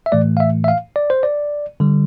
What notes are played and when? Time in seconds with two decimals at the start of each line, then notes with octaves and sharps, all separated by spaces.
0.06 E5
0.12 A2 E3 A3 D5
0.37 F5
0.40 E5
0.64 E5
0.68 F5
0.96 D5
1.10 C5
1.23 D5
1.80 D3 G3